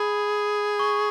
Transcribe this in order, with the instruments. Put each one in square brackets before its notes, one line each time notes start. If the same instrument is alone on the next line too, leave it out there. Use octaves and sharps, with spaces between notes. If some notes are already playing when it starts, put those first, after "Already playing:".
Already playing: [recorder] G#4 [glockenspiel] B5
[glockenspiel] C#6